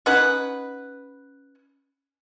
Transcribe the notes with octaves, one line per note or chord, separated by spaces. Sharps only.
C#4 D#4 B4 F#5